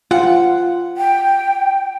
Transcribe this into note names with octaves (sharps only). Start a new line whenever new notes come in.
F4 F#5
G5